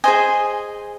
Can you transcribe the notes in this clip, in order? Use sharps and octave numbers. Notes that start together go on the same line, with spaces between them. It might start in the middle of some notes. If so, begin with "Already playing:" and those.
G#4 C5 D#5 G#5